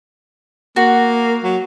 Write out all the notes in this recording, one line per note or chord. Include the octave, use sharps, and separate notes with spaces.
A#3 F#4
F#3